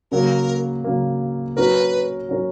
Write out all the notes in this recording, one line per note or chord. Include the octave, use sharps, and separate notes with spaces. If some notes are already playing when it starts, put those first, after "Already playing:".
C#3 F#3 A#3 A#4
C#3 F#3 A#3
F#3 C#4 F#4 A#4 B4
F#3 C#4 F#4 A#4